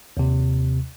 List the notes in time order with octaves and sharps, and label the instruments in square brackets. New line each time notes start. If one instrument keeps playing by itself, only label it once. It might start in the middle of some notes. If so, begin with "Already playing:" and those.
[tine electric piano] D#2 C3